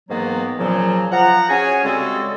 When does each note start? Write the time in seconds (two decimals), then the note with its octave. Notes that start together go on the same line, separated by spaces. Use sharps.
0.09 G#2 D#3 E3 F#3 A#3 B3
0.58 A#2 C#3 F3 F#3
1.11 F3 F#5 A#5
1.49 C#4 F#4 G#4 C#5 G#5
1.83 C#3 G3 G#3 C4 F#4 A4